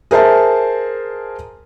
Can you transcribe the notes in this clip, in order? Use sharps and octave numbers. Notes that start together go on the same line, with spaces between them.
G#4 A#4 C5 E5 A5